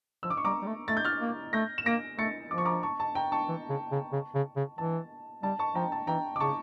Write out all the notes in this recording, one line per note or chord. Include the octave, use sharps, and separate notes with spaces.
F3 E6
D6
C#6
G3 A#5 D6
G3
A3
A3 A6
G6
F6 A6
A#3
A3 G6 A#6
E7
A#3 A#6 D7
A3 A6 C#7
F3 D6
C#6
A#5 D6
A5 C#6
A5
G5 A#5
A5 C#6
E3
C#3
C#3
C#3
C#3
C#3
E3 A5
G3 A5
A5 C#6
F3 G5 A#5
A5
E3 G5 A#5
D6
C#3 A5 C#6